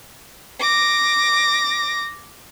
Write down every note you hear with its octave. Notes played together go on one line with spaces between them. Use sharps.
D6 A#6